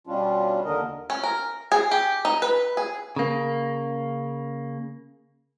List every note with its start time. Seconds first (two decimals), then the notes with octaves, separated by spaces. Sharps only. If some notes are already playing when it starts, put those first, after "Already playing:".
0.07 B2 G3 C#4 D4 F4
0.65 D#2 D3 D4 A#4 D#5
1.10 C#4
1.23 A#4
1.72 G#4
1.91 G4
2.25 D#4
2.42 B4
2.77 G#4
3.16 C#3 A#3